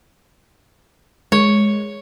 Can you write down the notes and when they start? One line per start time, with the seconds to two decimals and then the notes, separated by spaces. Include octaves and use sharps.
1.32 G#3 C#5